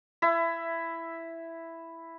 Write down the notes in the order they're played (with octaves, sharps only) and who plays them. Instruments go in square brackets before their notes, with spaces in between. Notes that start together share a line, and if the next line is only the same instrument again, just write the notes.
[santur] E4 E5